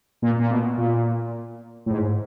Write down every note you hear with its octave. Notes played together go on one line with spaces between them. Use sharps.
A#2
A#2
B2
A#2
A2
G#2